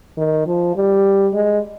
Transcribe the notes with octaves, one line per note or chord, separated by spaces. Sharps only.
D#3
F3
G3
G#3